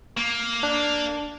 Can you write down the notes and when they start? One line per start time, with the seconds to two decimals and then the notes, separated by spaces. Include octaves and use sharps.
0.17 A#3
0.63 D4